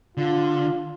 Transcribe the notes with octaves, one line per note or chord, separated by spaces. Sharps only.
D3 F4